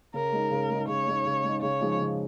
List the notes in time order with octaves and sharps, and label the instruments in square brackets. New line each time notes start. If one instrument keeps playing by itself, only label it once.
[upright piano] C#3 [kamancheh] A#4
[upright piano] G#3 D#4
C#3
G#3 D#4
[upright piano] C#3 [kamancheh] C#5
[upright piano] G#3 D#4
C#3
G#3
D#4
[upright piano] C#3 [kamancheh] C#5
[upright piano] F3 G#3 D#4
C#3